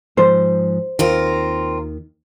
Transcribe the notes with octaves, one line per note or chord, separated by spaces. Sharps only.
G#2 F3 C5
D#2 D#3 C4 F4 A#4